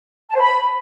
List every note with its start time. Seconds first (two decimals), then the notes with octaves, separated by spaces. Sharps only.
0.30 A5
0.35 C5
0.40 B5